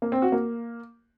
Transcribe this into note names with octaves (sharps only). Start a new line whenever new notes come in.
A#3
C4
F#4
A#3